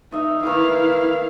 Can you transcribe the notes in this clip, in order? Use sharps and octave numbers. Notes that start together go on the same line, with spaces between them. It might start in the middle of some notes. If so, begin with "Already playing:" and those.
D#4 D#5 E5
D#3 E4 B4 F5 D6